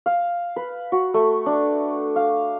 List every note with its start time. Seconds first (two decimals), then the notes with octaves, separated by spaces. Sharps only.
0.06 F5
0.56 B4
0.92 F#4
1.14 A3
1.46 D4
2.16 F5